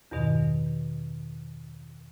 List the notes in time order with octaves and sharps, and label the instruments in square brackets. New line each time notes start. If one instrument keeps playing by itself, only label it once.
[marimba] E2 G2 B2 D#3